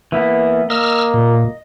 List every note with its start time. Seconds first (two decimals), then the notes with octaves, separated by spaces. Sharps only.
0.12 E3 A#3 B3
0.70 A#3 D#5 E6 F6
1.14 A#2